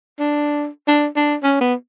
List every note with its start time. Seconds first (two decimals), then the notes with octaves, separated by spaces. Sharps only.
0.19 D4
0.88 D4
1.16 D4
1.43 C#4
1.61 B3